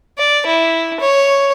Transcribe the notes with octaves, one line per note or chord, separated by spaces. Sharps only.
D5
E4
C#5